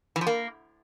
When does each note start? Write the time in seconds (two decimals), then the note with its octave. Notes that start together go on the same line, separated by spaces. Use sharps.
0.16 E3
0.21 F3
0.27 A#3